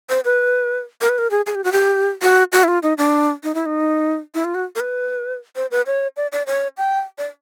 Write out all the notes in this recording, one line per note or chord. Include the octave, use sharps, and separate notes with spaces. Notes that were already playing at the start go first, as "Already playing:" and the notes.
C5
B4
A#4
B4
A#4
G#4
G#4
G4
F#4
G4
F#4
F#4
E4
F4
D#4
D4
D#4
E4
D#4
E4
F4
F#4
A#4
B4
C5
B4
C#5
D5
D5
C#5
G5
D5